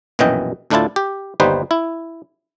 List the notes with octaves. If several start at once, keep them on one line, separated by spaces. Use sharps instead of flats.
A#1 F#2 B2 E3 D#5 G5
D2 A2 D4 E4 F4 A5
G4
G1 D#2 G3 D#4 B4 C5
E4